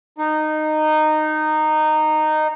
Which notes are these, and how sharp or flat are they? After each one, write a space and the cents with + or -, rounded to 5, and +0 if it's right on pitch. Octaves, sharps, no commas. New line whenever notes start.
D#4 -15